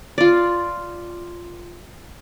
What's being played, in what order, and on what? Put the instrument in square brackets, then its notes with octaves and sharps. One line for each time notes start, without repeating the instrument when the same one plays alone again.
[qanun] F4 D5